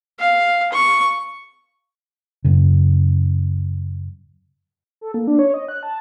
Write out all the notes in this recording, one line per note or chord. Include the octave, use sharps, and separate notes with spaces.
F5
C#6
F#2 C#3
A4
A#3
D4
C#5
D#5
F#6
A5